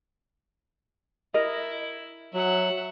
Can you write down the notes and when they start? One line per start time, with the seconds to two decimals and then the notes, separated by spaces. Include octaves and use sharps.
1.34 E4 A#4 D#5
2.34 F#3 E5 F#5